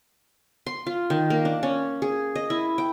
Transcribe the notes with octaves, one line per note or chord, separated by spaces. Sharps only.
C6
F4
D#3
A#3
D4
C#4
G#4
D#5
E4
G5